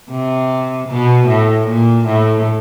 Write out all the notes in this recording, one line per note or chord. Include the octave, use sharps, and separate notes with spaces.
C3
B2
A2
A#2
A2